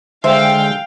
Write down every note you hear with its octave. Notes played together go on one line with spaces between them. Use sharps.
D3 G#3 C5 E5 F5 G5